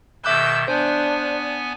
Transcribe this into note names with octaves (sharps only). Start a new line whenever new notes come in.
B2 D#3 E5 D6 E6 F#6 G6
B3 D4 C5 G#5